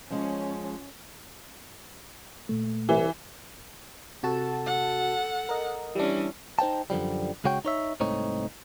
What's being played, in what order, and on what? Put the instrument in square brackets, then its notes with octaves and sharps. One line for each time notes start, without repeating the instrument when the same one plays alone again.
[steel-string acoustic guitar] F3 G#3 [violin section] C#4
[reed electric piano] A#2 A3
[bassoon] C2 [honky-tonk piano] E3
[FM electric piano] C3 F#4 A5 [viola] A4
[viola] A4 F#5
[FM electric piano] A#4 D#5
[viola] E3 C#4 [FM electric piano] G3 D4
[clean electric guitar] D#4 C5 G5 A5
F#2 D3 F3 G3
C#2 C#3 G#3 F#4 C#5 G5
D#4 C#5 E5
C2 G#2 A3 C4 D#4 C#5